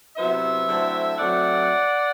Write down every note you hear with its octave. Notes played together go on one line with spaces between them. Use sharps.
C3 F#3 B3 E4 C5 E5
D3 F#3 A3 C4 E4
F#3 A3 C4 D5 F#5